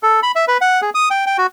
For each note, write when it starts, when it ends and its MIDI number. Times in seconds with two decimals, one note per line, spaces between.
0.03 0.20 69
0.23 0.32 83
0.35 0.45 76
0.48 0.58 71
0.61 0.81 78
0.82 0.90 68
0.95 1.09 87
1.11 1.26 79
1.26 1.37 79
1.38 1.47 66